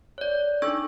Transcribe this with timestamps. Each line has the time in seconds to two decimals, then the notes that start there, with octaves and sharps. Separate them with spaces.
0.18 C#5 D5
0.62 D4 D#4 A4 C#6 E6 G#6